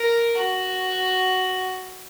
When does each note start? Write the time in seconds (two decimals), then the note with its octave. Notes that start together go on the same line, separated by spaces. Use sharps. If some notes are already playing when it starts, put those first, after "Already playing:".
Already playing: A#4
0.38 F#4